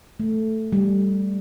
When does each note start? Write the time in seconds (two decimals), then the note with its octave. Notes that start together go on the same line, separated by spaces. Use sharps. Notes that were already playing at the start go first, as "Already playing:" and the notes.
0.20 A3
0.72 G3